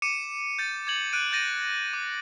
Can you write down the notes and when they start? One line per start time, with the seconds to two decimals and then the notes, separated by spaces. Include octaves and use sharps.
0.02 D6 C#7 D#7 E7
0.59 G6 A6
0.87 D6 G#6 F#7
1.13 F#6 D7 D#7
1.32 G6 A6 A#6 D#7
1.93 D6